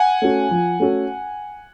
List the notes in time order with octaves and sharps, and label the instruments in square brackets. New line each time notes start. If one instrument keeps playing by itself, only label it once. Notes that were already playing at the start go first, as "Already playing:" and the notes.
Already playing: [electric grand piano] F#5 G#5
[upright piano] A3 C#4 F#4 A4
F3
A3 C#4 F#4 A4